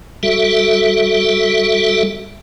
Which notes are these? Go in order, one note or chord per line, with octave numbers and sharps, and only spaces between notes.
G3 F#4 A4 E5